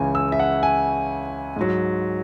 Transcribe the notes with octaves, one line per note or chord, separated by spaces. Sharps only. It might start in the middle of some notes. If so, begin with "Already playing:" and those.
Already playing: C#2 C#3 E3 G#5
E6
E5
F#5
G#5
G#2 F#3